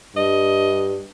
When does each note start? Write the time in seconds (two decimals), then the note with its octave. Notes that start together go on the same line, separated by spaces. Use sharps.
0.16 G2 D#5